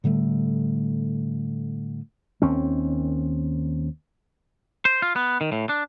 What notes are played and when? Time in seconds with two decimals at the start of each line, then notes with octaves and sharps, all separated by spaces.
0.04 A2 D3 G3 A3
2.42 D#2 C4 C#4
4.85 C5
5.02 F4
5.16 B3
5.41 D#3
5.52 A2
5.69 D4